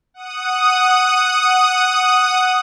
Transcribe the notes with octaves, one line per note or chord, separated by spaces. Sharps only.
F#5 D#6